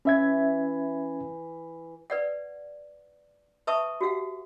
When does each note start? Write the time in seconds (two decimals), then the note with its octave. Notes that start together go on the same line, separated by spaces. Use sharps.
0.05 E3 C#4 E5 G#6
2.10 B4 D5 F#5
3.67 B4 E5 A5 C#6 D#6
4.01 F#4 G4 F5 F#5